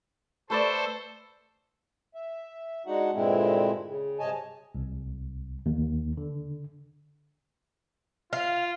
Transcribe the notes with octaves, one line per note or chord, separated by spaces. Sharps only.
A3 A4 B4 C5 D5
E5
G#3 D4 D#4 F#4 F#5
G2 A#2 D3 G#3 C4 E4
C#3
G2 C3 C#5 D#5 G#5 A5
C2
D#2
D3
F4 F5